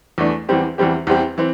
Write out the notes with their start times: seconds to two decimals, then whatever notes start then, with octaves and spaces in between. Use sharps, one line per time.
0.18 E2 E3 A3 D4
0.49 E2 E3 G3 C4 G4
0.78 E2 E3 G3 C4 G4
1.07 E2 E3 G3 C4 G4
1.38 E3 C4